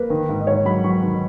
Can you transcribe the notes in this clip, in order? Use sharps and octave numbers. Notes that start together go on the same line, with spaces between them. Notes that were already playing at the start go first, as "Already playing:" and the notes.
Already playing: A#3 B4
D#3
G#2
D#5
G#2 C#5
F#3 B5
F#3 C#6
D#3